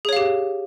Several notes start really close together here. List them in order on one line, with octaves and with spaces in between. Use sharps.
G#4 C#5 F5 G4